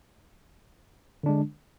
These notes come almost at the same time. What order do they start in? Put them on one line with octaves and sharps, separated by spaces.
D3 D4 G#3